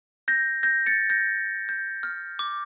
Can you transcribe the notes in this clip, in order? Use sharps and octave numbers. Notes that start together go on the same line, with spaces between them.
G6 A#6
G6 A#6
A6 C#7
G6 A#6
G6
F6
D6